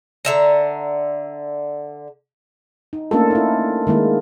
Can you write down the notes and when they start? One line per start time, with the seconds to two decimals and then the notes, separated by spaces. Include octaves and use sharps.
0.25 D3 E5 A#5
2.93 D#4
3.11 A3 A#3 C#4 D4 F4 A4
3.31 D#4 E4
3.87 D#3 G#3 A#3 E4